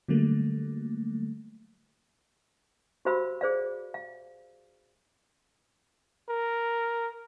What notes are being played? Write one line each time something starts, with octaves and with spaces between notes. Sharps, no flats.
D3 F#3 G3 A3 A#3
F#4 G4 C5 F5 B5 E6
G#4 C5 D5 F5
F5
A#4